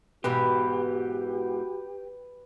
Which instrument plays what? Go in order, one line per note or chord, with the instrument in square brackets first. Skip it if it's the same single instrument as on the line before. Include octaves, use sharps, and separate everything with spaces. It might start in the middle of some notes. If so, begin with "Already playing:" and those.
[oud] G#2 B2 E3 [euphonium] F#4 [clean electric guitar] G4 [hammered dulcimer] B4